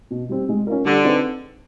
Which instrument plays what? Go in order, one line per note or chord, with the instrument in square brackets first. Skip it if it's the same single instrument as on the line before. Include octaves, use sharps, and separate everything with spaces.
[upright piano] B2
G3 C4
G#3
C#4 F4 A#4
[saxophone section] D3 [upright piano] G3
[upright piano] C4 D#4 G#4 B4